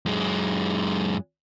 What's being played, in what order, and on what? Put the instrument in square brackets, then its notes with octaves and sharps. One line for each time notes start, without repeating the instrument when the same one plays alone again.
[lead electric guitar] F#2 G#3